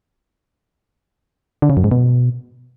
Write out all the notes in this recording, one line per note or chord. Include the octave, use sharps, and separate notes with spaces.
D3
C#3
F#2
G#2
B2